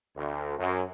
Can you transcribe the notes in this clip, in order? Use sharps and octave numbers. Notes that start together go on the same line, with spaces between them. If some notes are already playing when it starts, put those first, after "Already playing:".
D2
F#2